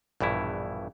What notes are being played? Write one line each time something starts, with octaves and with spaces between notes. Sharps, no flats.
A#1 G2 B2 E3 E4